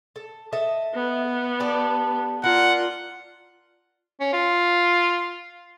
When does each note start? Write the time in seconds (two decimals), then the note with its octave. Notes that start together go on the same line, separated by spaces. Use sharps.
0.16 A4
0.53 A4 D#5 E5
0.95 B3
1.60 D4 G4 A4
2.44 D4 F4 A#4 F#5
4.20 C#4
4.33 F4